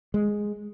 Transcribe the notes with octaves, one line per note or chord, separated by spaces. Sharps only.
G#3